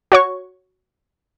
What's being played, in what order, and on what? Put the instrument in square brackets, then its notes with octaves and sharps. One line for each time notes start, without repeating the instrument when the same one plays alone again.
[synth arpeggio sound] F#4 C#5 C#6